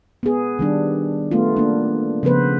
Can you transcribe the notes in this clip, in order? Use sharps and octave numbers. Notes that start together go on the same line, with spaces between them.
B3 G#4
D#3 G3 D4
A3 B3 F4
A#3 D4
C#3 F3 B3 B4 C5